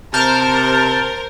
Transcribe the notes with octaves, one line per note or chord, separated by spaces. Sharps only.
C3 A#4 C5 A5 F6 G6